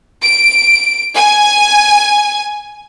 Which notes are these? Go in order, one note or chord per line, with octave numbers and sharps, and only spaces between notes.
D7
G#5